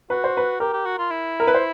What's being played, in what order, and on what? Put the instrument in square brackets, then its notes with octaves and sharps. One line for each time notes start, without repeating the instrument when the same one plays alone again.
[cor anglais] F#4 [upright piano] B4
[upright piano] C5
B4
[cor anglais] G4 [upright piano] A#4
[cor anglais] G4
F#4
F4
E4
[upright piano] A#4
B4
C5